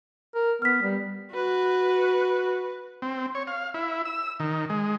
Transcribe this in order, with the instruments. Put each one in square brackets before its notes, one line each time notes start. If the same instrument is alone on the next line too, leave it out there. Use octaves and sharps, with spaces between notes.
[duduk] A#4
[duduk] B3 [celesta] F6 B6
[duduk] G3
[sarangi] F#4 [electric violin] B4
[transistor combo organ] C4
C#5
F5
E4
E6
D#3
G#3